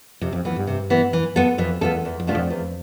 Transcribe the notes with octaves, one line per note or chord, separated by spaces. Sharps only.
F2 C3
F2
F2 E3 B3
G2
C3
E3 B3
E3
B3 F4 A4
F2 E3
E2 B3 F4 A4
E2
F2
B2 A3 D4 F4
F2
E2